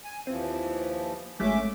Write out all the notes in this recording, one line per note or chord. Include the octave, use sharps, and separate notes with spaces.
G#5
D#2 E3 F3 C4
G#1 G#3 A3 C#4 E5 D6